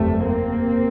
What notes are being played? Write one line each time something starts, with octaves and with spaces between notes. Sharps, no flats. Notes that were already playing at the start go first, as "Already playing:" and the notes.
Already playing: F#1 E2 C3 G3 A3
A#3 C4